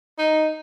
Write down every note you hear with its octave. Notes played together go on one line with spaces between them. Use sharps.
D#4